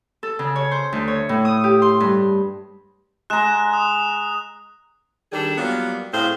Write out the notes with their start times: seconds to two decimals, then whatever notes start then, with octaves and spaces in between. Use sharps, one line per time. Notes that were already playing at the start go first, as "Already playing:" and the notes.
0.23 A4
0.39 C#3
0.56 C#5
0.71 C5
0.92 D2
1.08 C#5
1.29 A2
1.45 D#6
1.64 G4
1.82 C6
2.00 G2
3.30 G#3 A#5 F#6 E7
3.73 D#6
5.31 D#3 G3 D4 G#4 A4
5.57 F#3 G3 A#3 B3 F4
6.12 A2 C4 G#4 C5 F5